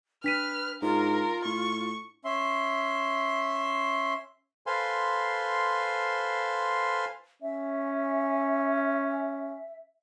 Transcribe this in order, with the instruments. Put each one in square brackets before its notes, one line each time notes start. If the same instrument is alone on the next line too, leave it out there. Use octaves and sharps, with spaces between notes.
[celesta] D4 B6 D#7 [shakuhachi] B4 [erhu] F6
[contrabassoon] G#2 [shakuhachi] F4 [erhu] A#4
[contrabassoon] A2 [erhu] C#6
[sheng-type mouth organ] C#4 E5 C6
[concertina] A4 B4 C5 F5 G#5 C6
[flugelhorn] C#4 [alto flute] E5